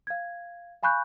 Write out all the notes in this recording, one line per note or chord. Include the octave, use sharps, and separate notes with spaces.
F5 G#6
F5 G#5 B5 C#6 F#6 G6